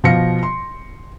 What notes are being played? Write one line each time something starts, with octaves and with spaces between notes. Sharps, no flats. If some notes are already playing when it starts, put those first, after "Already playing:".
B2 F3 F5 A#6 C#7
C6